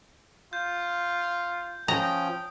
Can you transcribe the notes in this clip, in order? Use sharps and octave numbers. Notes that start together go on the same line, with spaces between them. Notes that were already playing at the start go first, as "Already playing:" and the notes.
F4 G6
F3 C#4 G5 A#5 D#6